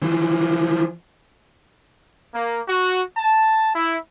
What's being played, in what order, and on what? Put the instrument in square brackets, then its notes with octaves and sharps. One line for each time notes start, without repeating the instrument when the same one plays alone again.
[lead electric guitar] E3 F3
[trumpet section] A#3
F#4
A5
E4